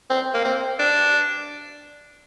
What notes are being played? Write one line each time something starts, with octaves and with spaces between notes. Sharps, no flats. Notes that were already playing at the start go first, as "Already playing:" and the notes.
C4
A#3
C4
D4